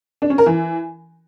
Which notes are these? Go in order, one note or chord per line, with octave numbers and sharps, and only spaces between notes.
D4
C#4
A#4
E3